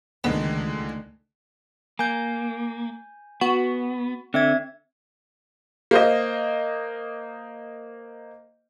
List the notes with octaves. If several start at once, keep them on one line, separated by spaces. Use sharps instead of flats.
C#2 D3 D#3 G#3 A3 B3 D4 D#4
A#3 G#5 G6
B3 F#4
D3 C4 E5 G#6
A#3 C5 D#5